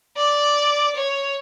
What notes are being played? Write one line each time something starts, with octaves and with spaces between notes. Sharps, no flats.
D5
C#5